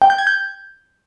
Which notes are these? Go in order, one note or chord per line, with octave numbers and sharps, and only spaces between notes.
G5
G6
G#6
G6